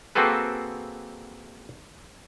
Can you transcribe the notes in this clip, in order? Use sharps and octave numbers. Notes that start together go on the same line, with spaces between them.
A#3 C4 F#4 G#4 A4 B4